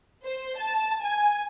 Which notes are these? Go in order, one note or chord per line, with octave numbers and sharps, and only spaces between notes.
C5
A5
G#5